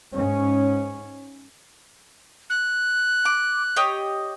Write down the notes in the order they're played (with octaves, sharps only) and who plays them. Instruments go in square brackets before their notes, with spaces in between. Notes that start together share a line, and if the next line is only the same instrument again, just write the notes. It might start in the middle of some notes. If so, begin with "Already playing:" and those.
[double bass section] G#2 C#4
[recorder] F#6
[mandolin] D6
G4 C#5 D#5